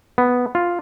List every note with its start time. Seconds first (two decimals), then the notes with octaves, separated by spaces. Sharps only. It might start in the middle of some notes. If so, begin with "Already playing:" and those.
0.18 B3
0.55 F4